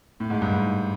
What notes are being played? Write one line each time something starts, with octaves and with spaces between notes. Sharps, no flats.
A2
G#2
G2
G#2